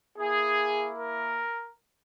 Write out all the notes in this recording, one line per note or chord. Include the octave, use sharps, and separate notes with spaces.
A#3 E4 G#4
A#4